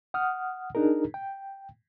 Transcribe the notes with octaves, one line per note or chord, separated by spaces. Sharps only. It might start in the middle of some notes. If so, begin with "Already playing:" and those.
F#5 D#6 F6
D4 D#4 G#4 A#4
G5